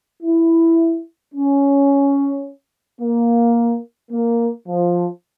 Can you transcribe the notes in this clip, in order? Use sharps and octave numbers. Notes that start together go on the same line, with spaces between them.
E4
C#4
A#3
A#3
F3